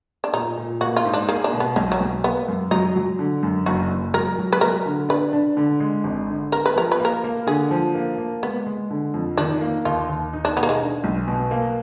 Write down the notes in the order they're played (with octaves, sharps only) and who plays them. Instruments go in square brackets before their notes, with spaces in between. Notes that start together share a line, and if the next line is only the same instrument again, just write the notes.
[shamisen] D4
[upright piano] A#2 [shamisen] D#4
[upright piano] A#2
[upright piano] A#3 [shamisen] F#4
[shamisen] F4
[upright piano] G#2
[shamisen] D4
[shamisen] A#3 [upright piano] G#4
[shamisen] D4
[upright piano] B2
[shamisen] B3
[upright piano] B1 [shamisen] F#3
[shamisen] F#3
[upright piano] B1
[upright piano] A#3 [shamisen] B3
[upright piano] F#2
[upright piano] F#3 [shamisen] D#4
[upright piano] F#3
D3
F#2
[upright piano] F#1 [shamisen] F#4
[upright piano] F#1
[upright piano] F#3 [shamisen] A#4
[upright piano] F#3
[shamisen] B4
[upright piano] F#3 [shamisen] A#4
[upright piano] D3
[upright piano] D4 [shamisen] B4
[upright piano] D4
D3
G#3
G#1
D3
[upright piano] B3 [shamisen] A#4
[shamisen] B4
[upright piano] F3 [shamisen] A#4
[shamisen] B4
[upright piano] A#3
[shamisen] A#4
[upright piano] A#3
[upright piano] D3 [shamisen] G#4
[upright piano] F3
A#3
A#3
[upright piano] G#3 [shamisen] B3
[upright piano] G#3
D3
F2
[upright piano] D#3 [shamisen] D4
[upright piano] A#3
[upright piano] D#2 [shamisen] F4
[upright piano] D#2
D#4
[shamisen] D4
[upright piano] B2 [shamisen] B3
[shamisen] A#3
G#3
[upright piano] D4
B1
B2
A#3